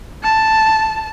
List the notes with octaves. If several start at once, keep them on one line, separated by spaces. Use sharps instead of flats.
A5